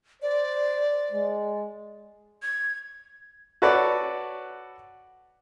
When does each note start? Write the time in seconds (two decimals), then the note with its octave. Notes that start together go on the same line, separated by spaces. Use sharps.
0.22 C5 D5
1.11 G#3
2.42 G#6
3.62 F#4 A4 B4 C#5 D5